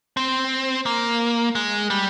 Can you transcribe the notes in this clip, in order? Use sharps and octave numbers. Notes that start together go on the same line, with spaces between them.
C4
A#3
G#3
G3